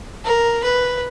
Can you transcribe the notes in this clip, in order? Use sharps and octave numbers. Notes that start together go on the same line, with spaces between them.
A#4
B4